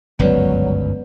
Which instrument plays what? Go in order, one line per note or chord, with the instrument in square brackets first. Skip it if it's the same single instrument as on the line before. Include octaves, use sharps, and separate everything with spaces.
[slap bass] G1 C#2 F#2 [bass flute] F#3 [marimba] B3 B4 D5